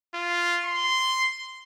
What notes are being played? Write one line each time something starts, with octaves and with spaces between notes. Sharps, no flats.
F4
C6